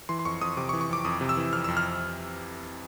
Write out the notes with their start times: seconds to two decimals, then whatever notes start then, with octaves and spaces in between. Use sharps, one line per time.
0.09 E3 C6
0.19 C6
0.25 F2 C#6
0.41 F2 D#6
0.57 C3 D6
0.69 C#6
0.73 E3
0.81 C#6
0.90 F2 D6
1.05 F2 D#6
1.21 C3
1.29 E6
1.37 E3
1.52 F2 F6
1.64 F2 E6
1.77 F6